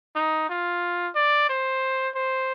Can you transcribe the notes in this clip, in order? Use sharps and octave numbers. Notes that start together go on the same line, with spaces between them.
D#4
F4
D5
C5
C5